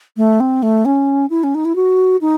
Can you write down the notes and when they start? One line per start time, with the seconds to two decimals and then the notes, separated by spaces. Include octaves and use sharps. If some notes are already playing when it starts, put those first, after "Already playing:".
0.17 A3
0.40 C4
0.63 A3
0.85 C#4
1.30 E4
1.44 C#4
1.55 D#4
1.65 E4
1.76 F#4
2.21 D#4